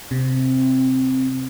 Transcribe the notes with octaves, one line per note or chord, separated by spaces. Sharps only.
C3 C4